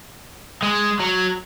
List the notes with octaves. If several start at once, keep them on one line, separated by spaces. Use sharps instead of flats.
G#3
F#3